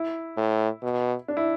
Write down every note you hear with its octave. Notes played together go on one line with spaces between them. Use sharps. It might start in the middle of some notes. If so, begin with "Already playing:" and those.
Already playing: E4
A2
B2
D4
E4